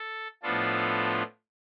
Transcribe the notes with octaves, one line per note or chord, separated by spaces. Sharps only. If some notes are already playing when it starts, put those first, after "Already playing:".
Already playing: A4
A2 F3 B3 D4 F4 A4